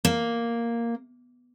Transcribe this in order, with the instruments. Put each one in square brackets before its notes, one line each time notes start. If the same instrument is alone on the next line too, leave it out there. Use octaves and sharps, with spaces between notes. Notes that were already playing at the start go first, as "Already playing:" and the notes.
[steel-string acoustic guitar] A#3